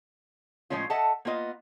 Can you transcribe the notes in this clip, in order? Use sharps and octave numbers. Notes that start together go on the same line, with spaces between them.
A2 F3 G#3 C#4 F4
A4 D#5 E5 F#5 A5
A#3 B3 F4 D#5